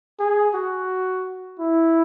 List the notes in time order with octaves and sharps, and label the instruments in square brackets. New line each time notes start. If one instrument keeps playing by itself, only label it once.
[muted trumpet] G#4
F#4
E4